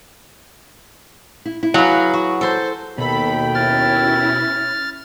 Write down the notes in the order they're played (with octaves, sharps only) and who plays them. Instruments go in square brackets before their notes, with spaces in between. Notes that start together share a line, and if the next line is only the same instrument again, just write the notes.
[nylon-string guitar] E4
E4
[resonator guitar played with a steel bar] F#3 [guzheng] G#4 B4 [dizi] F5
[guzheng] F#4
[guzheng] A4 C6 [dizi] C5
[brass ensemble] D#2 G5 [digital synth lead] B2 [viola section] A4 B5
[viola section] C#4 E4 [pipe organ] F6 A6